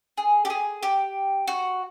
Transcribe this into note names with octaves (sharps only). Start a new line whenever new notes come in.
G#4
G4
G#4
G4
F#4